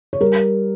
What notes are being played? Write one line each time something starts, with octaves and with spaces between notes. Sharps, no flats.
C#5
G3 A#4